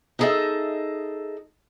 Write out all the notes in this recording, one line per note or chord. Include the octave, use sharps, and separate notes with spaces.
D#4 E4 G#4 A4 D#5 E5